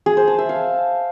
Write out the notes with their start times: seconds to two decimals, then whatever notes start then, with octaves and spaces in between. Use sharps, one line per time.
0.06 G#4
0.17 C5
0.28 A5
0.38 E5
0.49 F5